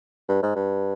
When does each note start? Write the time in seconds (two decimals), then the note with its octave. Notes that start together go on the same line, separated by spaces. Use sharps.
0.29 G2
0.43 G#2
0.56 G2